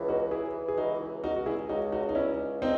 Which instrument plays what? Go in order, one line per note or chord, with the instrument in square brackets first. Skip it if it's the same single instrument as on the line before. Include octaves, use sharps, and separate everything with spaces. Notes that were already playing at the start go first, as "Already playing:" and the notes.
Already playing: [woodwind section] C#2 E3
[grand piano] D#4 F#4
[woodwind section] E3 [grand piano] E4 G#4
[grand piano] G#4
[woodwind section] C#2 [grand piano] D#4 F#4
[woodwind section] C#2 [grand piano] D#4 F#4
[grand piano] F#4
E4 G#4
[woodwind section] C#2 [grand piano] D#4 F#4
[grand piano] D#4 F#4
D#4
[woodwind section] C#2 [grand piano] C#4 E4
[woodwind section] C#3 [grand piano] C4 D#4